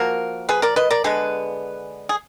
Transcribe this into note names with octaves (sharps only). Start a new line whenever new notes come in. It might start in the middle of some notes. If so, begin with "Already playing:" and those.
Already playing: F3 A#3 F#4 A#4
G#4 B4
A#4 D5
B4 D#5
A#4 D5
D3 G#3 B3 G#4 B4
G#4